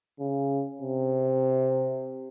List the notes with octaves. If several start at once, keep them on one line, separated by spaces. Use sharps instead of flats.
C#3
C3